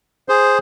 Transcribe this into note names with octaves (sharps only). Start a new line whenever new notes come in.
G#4 C5